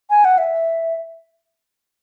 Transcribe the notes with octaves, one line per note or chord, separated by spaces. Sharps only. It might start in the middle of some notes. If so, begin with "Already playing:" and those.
G#5
F#5
E5